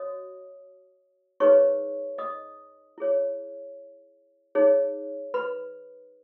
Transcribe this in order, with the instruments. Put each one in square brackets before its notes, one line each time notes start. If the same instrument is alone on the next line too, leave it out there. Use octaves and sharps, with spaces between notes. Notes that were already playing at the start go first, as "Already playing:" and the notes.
Already playing: [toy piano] F#4 C#5 D#5 D#6
D#4 G#4 B4 C#5 C#6
D#5 D#6
E4 G#4 C#5
D#4 G#4 C#5
B4 B5